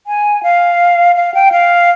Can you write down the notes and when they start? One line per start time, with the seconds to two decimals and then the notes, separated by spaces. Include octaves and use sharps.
0.07 G#5
0.43 F5
1.16 F5
1.34 G5
1.52 F5